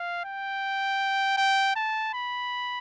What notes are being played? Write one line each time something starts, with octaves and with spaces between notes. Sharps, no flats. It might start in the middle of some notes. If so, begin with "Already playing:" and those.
Already playing: F5
G5
G5
A5
B5